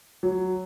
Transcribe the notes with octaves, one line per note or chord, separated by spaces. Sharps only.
F#3